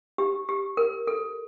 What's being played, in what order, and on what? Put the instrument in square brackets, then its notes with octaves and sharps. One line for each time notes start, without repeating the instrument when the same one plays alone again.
[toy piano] G4
G4
A#4
A4